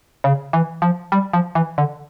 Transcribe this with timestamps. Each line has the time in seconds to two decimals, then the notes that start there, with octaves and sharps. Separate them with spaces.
0.24 C#3
0.53 E3
0.82 F3
1.12 G3
1.33 F3
1.55 E3
1.78 D3